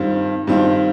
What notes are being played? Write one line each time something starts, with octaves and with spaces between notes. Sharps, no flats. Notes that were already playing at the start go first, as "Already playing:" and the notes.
Already playing: G2 D#3 C4 F4
G2 D#3 C4 F4